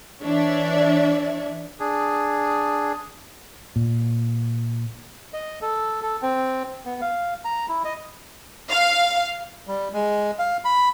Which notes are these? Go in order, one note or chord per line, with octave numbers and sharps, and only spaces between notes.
E3 D4 C#5 D5 E5
D4 G#4
A#2
D#5
A4
A4
C4
B3
F5
A#5
E4
D#5
F5
G3
G#3
F5
B5